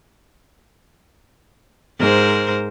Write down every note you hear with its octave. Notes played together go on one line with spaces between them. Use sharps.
G#2 A#4 C5